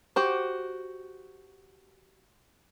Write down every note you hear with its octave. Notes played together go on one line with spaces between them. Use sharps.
F#4 G4 C5